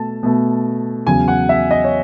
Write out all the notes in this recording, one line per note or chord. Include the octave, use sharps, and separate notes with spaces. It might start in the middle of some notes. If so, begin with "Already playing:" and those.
Already playing: B2 A3 A5
B2 A3
E2 C#3 F#3 G#5
F#5
E5
D#5
C#5